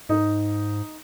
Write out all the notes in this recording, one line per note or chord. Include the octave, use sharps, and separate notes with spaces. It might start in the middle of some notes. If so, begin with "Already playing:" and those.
G#2 D#4